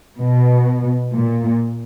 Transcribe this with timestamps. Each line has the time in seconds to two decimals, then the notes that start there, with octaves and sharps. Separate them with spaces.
0.18 B2
1.14 A#2